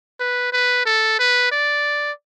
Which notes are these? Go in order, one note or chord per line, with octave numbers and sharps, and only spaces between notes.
B4
B4
A4
B4
D5